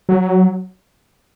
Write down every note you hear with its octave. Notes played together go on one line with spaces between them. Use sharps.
F#3